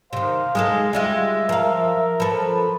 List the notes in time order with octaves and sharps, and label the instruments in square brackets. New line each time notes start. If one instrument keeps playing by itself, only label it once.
[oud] C3 D#3 [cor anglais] C5 [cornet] F5
[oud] G#3 D#4 A4 [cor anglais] G#4
[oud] G3 G#3 F4 [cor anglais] E5
[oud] F3 F5 [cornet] A#4
[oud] F3 A4 [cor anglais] B4